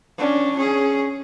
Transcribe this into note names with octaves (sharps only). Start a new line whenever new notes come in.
C#4 D4
C#4 G#4